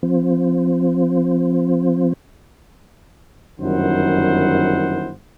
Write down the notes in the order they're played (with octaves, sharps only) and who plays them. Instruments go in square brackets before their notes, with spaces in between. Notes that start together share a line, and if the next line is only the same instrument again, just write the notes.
[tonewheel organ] F3 C4
[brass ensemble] G1 F#2 D#3 E4 C5 F#5